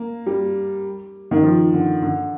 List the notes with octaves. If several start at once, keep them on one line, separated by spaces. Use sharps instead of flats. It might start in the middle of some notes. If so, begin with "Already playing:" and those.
Already playing: A#3
G3
D#3
F3
D3
D3